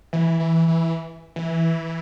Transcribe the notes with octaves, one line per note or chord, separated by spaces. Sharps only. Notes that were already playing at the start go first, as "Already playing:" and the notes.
E3
E3
E3
E3